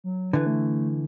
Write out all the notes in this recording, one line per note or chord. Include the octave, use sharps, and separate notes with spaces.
F#3
D3 E3 B4
A3